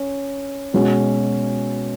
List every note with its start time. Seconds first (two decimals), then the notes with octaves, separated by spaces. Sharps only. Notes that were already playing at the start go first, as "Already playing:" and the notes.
Already playing: C#4
0.73 B2 G#3 C#4 F#4